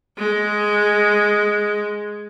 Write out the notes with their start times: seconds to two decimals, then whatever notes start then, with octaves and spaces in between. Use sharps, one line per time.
0.18 G#3